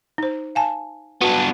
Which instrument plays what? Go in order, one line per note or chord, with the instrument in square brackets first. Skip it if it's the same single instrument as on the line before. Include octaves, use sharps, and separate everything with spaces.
[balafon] D#4 C5
F5 G#5 A5
[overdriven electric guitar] B3 D4 [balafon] F#4